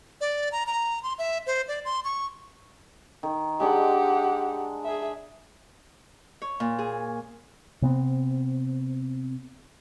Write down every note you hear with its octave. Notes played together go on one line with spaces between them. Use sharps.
D5
A#5
A#5
C6
E5
C5
D5
C6
C#6
D#3
G#3 D4 G4 F#5
G#4 E5
C#5
A#2
G#4
C3 B3 C4